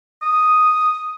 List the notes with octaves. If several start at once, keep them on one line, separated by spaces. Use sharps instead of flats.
D#6